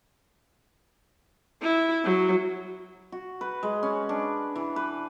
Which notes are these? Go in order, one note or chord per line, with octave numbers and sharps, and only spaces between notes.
E4
F#3
F#4
B4
G#3
C#4
D4
E3
B4